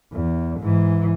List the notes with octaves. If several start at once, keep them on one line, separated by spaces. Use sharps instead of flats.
E2
G#2 E3